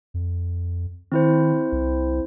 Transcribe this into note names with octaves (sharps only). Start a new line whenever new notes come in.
F2
D#3 C4 E4 C5
C2